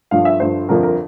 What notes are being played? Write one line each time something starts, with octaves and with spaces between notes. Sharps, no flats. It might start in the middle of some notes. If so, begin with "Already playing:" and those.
G1 G2 F3 F5
E5
G1 G2 F3 C5
G1 F2 D3 F3 A#4
A#4